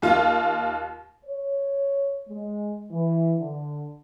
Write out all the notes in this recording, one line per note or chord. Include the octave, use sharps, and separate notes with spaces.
D#2 F4
C#5
G#3
E3
D3